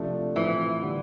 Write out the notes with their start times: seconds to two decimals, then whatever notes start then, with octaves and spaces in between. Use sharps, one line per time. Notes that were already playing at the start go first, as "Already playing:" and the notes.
Already playing: C3 F3 A3 D4
0.36 A2 E3 F3 C4
0.82 D3 G3